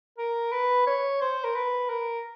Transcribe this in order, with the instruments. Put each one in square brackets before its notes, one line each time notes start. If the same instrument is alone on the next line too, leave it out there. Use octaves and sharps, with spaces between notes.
[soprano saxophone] A#4
B4
C#5
C5
A#4
B4
A#4